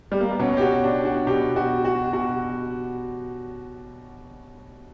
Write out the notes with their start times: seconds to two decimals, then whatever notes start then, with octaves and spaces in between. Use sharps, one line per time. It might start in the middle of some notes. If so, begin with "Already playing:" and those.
0.12 G3
0.20 A#3
0.31 B3
0.39 B2 C#4
0.57 G4
0.61 F#4
0.84 D4
1.05 F#4
1.27 B2 G4
1.56 F#4
1.85 F#4
2.13 B2 F#4